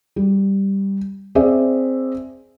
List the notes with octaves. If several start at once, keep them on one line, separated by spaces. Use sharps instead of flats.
G3
C4 G#4 D5 E5